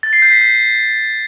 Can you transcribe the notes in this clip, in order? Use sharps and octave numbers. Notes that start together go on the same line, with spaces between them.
A6
C7
G6
B6
G6